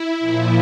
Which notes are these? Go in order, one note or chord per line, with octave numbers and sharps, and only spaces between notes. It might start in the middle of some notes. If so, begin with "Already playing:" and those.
Already playing: E4
A#2 F3